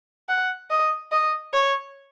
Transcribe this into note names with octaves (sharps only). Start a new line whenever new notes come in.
F#5
D#5
D#5
C#5